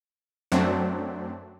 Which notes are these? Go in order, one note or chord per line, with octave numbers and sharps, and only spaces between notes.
F#2 F#3 A3 C4 D4